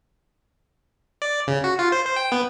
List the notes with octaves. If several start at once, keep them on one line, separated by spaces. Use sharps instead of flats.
D5
C#3
F#4
F4
C5
C5
G5
B3